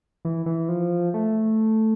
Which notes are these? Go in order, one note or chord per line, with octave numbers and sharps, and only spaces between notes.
E3
E3
F3
A3